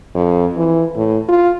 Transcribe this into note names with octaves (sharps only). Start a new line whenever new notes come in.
F2
E3
A2
F4